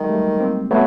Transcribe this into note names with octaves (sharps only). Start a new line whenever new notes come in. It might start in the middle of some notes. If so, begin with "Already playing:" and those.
Already playing: D#3 F#3 G#3
G3 A3
A#3 C4
F#3 A3 B3